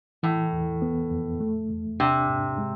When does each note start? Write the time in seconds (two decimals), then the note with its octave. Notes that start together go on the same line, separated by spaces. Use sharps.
0.23 A2 E3
0.53 E2
0.82 B3
1.11 F2
1.40 A3
1.70 E2
2.00 C3 D4
2.29 G#2
2.58 G#3